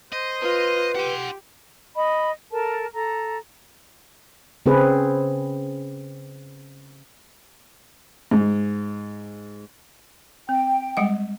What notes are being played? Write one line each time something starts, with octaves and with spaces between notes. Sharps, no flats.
C5 D#5
F4 B4
G4 F#5 C6
D#5 B5
A4 A#4 A5
A4 A#5
C#3 C4 G#4 B4
G#2
C4 G5
G3 G#3 F#5